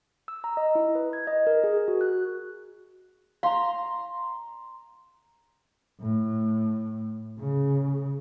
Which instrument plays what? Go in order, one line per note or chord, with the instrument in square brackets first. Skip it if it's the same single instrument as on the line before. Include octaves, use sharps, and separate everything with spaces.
[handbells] E6
A#5
D#5
E4
B4
G#6
D#5
A#4
G#4
F#4
F#6
[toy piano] F5 [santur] A#5 C6
[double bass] A2
C#3